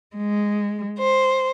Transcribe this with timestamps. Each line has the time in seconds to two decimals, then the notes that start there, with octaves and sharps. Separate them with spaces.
0.16 G#3
0.97 C5